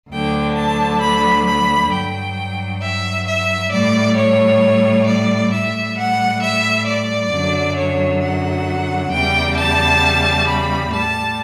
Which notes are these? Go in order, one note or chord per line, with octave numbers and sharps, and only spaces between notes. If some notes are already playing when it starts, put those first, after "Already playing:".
D2 D3 F#3 G5
A5
B5
B5
G2 F#3 G5
E5
E5
A2 G3 D5
C#5
D5
A2 G3 E5
F#5
E5
D5
F#2 D3 F#3
C#5
F#5
E2 C#3 G3 G5
A5
B5
A2 G3 A5